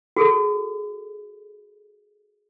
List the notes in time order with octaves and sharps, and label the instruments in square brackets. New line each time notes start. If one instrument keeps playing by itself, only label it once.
[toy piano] F#4 G#4 A4